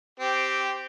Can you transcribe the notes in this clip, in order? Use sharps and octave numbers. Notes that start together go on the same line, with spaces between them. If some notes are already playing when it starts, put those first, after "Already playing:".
C4 G4